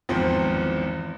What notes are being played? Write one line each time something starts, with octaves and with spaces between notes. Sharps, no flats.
G#1 E2 F3 C4